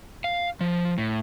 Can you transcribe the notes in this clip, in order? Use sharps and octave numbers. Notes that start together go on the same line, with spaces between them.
F5
F3
A2